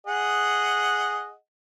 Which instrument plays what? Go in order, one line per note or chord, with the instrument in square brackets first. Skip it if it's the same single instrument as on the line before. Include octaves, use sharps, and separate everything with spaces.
[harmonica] G#4 D#5 F#5